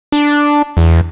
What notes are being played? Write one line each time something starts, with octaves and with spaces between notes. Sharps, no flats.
D4
E2